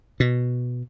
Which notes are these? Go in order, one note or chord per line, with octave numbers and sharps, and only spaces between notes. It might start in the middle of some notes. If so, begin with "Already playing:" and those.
B2